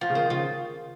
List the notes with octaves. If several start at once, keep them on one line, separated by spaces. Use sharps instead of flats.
F3 F4
C#3
D#3 C5
C#3 F4